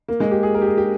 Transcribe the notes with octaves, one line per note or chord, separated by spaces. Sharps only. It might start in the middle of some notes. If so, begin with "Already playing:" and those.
A#3
G#3
G4
G#4
A#4
G4
G#4
G4